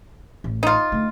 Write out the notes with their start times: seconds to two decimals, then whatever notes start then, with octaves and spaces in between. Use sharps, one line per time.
0.44 A1
0.63 D#4 F4
0.92 D3 A3